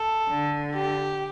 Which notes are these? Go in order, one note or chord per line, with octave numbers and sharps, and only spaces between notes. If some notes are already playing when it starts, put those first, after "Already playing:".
Already playing: A4
D3
G4